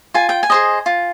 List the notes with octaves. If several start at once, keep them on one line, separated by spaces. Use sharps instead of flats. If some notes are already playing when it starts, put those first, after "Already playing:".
F4 G#5
G5
G#5
G#4 C5 D#5
F4